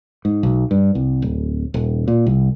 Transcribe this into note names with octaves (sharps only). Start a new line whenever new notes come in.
G#2
B1
G2
C2
D1
D#1
A#2
C2